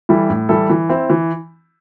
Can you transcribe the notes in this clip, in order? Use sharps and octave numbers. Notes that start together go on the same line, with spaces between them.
E3 G3 E4 A4
A2
E3 G3 E4 A4
E3
C4 E4
E3